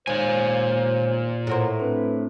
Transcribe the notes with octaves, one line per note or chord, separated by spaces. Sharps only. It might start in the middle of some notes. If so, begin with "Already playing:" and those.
D#2 A#2 G#3 C5 C#5 F5 G#5
A2 A#4 C5 C#5 F#5 A#5
A3 C4 D4 B4